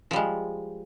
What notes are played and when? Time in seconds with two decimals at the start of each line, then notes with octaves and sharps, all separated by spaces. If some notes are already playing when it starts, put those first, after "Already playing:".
0.11 F3
0.13 G3
0.16 G#3